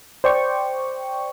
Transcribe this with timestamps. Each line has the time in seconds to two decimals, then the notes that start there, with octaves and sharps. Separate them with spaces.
0.24 C5 D5 G5 C#6